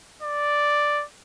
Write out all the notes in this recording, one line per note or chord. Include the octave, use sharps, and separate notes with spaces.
D5